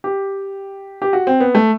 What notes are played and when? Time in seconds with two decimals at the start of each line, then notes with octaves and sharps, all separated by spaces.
0.04 G4
1.02 G4
1.13 F#4
1.27 C4
1.40 B3
1.55 A3